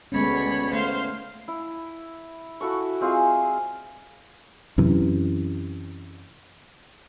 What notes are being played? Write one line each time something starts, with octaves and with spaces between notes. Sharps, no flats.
D2 G#3 B3 C#4 C#5 B5
A3 C5 F5
E4
E4 F#4 A4 C#6
G#3 C4 F4 G#4
F#2 C3 E3